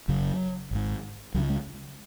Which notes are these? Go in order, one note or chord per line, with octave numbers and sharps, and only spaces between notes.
F#1 F#2 C#3 F#3
G#1 G#2
C#2 C#3 F#3
G#3